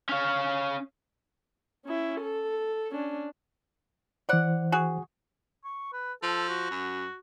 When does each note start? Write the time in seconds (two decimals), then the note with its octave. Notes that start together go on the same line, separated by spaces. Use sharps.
0.09 C#4 F5
1.86 C#4 E4
2.20 A4
2.91 C#4 D4
4.29 E3 C5 D5 F#5
4.72 F#4 G#4
5.64 C#6
5.93 B4
6.23 F3 A4
6.49 F#4
6.71 F#2